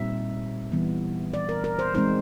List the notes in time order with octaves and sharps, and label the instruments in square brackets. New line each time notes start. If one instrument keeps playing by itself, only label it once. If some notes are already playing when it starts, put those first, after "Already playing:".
Already playing: [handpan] A#2 G3 C4 D#4 E5
E3 G3 B3
D5
A#4
A#4
C5
E3 G#3 C4 D#4 C5